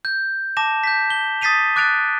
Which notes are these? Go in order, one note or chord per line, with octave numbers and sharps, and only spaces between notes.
G6
A5 D6 A#6 E7
G6 B6
G7
D#6 A6 B6 C7 D#7 F7
D6 F#6 A6 D7 F7